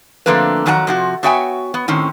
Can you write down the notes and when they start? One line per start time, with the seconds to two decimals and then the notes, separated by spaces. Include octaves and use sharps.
0.26 D3 F3 A3 A#3 C4 B4
0.66 F2 D#3 F#3 F#5 G#5 A#5
0.87 C3 F3 F#4
1.23 B3 F#4 C#5 E5 G5 G#5
1.74 B3
1.88 A2 D#3 C4 C#4